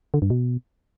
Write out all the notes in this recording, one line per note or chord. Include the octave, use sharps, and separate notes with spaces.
D3
G2
B2